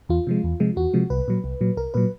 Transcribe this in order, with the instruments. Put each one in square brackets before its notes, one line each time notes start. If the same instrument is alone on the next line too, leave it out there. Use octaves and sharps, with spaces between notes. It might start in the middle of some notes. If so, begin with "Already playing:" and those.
[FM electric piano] E2 F4
C3 F3 G#3
E2
C3 F3 G#3
E2 F#4
C3 F3 G#3
C2 B4
A#2 F#3
C2
A#2 F#3
C2 A#4
A#2 F#3 B4